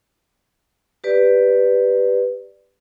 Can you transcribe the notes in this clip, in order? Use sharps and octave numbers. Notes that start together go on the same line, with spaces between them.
G4 B4 D5